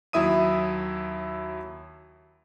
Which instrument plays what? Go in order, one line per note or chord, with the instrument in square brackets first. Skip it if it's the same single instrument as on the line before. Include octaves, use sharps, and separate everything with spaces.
[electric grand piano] D#2 F#3 E4 E5 D#6 D#7